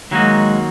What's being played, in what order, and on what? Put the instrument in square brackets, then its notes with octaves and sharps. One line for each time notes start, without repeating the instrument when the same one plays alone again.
[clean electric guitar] D#3 F#3 A#3 D#4 F#4 [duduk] G#3